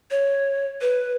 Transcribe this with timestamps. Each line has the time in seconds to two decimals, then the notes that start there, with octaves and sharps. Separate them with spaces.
0.11 C#5
0.81 B4